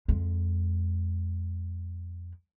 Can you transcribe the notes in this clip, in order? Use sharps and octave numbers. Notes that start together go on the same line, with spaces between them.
F2 G#3